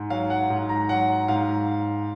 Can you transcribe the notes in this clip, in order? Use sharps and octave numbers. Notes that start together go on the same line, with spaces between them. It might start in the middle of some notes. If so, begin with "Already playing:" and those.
Already playing: G#2
F#3 F5
F#5
G#2
A#5
F#3 F#5
G#2 F5